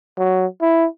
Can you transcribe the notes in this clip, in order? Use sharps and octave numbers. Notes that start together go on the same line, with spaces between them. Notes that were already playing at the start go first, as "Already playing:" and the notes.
F#3
E4